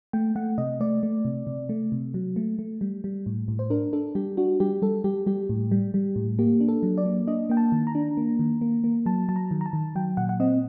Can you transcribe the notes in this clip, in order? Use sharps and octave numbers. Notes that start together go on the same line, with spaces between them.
A3 G5
A3 F#5
C3 D#5
A3 D5
A3
C3
C3
A3
C3
F#3
A3
A3
G3
G3
A2
A2
C5
D4 A#4
D4 A4
G3 G4
D4 F#4
G3 G4
G3 A4
G3 G4
G3 G4
A2
G3
G3
A2
A#3 G4
D4
A4
F#3
D5
A#3
D4 D#5
A#3 G5
A5
D#3
A#5
D4
A#3
D#3
A#3
A#3
F#3 A5
F#3 A5
A#5
D#3
A#5
A5
D#3
F#3 G5
A#2 F#5
F#5
C4 D#5